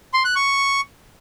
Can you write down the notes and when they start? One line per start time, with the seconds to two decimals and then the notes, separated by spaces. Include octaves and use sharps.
0.14 C6
0.25 F#6
0.36 C#6